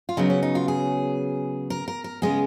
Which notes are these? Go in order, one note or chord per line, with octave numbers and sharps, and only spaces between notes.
F4
C#3 F#3 B3 D#4
C#4
D#4
F4
G#4
A#4
A#4
A#4
C#3 G#3 B3 G#4